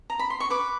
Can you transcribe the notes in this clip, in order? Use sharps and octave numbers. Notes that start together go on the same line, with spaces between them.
A#5
B5
C6
C#6
B4 D6